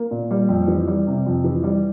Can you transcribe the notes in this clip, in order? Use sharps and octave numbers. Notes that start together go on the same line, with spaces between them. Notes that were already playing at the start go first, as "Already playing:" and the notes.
Already playing: A#3
A#2
G3
F2
E3
G3
C3
F2
E3
G3